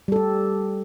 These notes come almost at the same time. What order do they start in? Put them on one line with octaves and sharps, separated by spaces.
G3 A4 G4